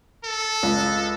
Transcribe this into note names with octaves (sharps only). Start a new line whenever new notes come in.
A4
C#2